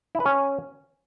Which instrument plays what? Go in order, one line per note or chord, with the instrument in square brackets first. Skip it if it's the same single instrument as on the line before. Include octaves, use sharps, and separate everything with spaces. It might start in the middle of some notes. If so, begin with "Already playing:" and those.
[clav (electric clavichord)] E4
B4
C#4